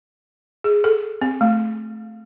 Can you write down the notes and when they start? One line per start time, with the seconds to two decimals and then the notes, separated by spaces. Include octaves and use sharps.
0.64 G#4
0.84 A4
1.21 C4
1.41 A3